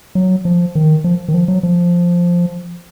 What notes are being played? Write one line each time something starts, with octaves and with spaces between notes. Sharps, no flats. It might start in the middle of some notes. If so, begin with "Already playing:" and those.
F#3
F3
D#3
F3
D#3
F3
F#3
F3